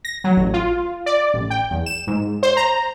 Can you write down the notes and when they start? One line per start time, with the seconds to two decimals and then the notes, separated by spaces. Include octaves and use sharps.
0.05 A#6
0.24 F#3
0.37 A1
0.54 F4
1.06 D5
1.34 A1
1.50 G5
1.71 E2
1.86 E7
2.07 G#2
2.43 C5
2.57 A#5